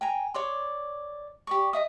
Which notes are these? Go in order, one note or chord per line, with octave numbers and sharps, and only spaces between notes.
G5 G#5 A#5
C#5 D5 C6
G4 D5 C#6
D#5 E5 D#6